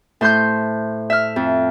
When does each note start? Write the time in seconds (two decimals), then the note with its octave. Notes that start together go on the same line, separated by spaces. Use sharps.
0.21 A2 C5 C6 G6
1.10 E5 F6
1.36 F2